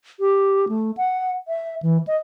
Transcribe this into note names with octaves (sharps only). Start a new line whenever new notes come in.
G4
A3
F#5
E5
E3
D#5